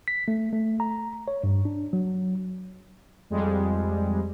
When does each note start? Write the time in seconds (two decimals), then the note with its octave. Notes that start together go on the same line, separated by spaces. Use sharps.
0.08 B6
0.28 A3
0.53 A3
0.80 A#5
1.28 C#5
1.44 G2
1.65 D4
1.93 F#3
3.30 F2 G3 G#3